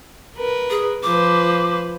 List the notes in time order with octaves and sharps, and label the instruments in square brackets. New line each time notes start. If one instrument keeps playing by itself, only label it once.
[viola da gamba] A#4 B4
[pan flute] G#4
[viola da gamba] F3 B4 C5 [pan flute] D6